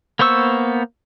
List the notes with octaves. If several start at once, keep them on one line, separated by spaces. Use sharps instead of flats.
A#3 B3 C5 C#6 E6